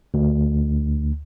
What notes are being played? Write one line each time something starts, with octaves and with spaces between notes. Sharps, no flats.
D2